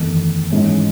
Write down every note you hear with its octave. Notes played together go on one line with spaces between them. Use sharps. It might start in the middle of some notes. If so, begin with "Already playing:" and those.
Already playing: F#1 E2 D#3 A3 D#4
G#2 E3 G#3 C#4